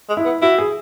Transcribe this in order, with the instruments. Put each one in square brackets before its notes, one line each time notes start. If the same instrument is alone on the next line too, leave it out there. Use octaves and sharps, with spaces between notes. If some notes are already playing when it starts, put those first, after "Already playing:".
[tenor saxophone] G#3
[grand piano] E4
[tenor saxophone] B3
[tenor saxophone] E4 [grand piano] F#4
[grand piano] G#4